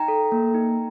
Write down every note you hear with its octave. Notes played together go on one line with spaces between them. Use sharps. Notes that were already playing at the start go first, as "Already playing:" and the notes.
Already playing: D#4 G5 A#5
A4
A#3
D#4